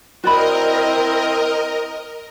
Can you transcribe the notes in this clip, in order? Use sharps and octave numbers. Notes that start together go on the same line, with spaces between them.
C4 E4 F#4 A#4 D5 D#5 B5